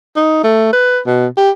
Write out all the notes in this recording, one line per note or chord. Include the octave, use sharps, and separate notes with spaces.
D#4
A3
B4
B2
G4